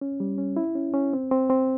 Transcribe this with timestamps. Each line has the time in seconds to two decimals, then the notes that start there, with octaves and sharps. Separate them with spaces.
0.01 C#4
0.20 G3
0.38 C#4
0.56 E4
0.75 C#4
0.94 C#4
1.13 C4
1.31 C4
1.50 C4